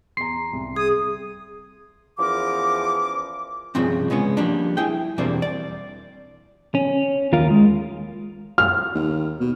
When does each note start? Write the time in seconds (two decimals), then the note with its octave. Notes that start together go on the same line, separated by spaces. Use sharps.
0.17 E2 A#5 C6 C7
0.53 C2
0.76 G#4 D#6
2.19 E2 F3 C#4 A#4 D6
3.75 C2 G2 C#3 F3 C4
4.10 C#3 G#3 B3 C#4
4.37 F3 G3 A#3 D4
4.77 E4 G#4 G5
5.18 E2 B2 G3 A#3 C4 D4
5.42 D5
6.75 C#4
7.33 D#2 F4 A#4 F5
7.51 G#3
8.58 F6
8.95 D#2
9.40 B2